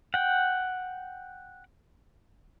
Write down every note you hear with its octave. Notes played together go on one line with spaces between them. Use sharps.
F#5 G5